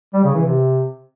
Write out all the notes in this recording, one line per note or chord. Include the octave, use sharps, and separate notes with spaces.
G3
C#3
E3
C3